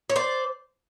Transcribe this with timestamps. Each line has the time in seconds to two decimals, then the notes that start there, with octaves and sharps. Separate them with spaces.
0.09 C#5
0.16 C5 D5